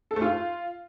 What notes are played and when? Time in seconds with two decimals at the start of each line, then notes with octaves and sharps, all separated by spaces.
0.11 A4
0.16 A3
0.22 F4